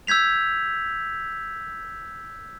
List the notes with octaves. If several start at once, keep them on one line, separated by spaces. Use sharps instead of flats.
E6 G6 G#6 B6 F7